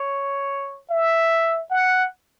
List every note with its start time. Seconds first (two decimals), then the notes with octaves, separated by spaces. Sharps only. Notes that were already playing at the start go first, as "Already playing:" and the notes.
Already playing: C#5
0.91 E5
1.70 F#5